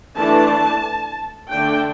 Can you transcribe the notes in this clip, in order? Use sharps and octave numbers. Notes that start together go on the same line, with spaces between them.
E3 A3 D4 A5
D3 A3 D4 G5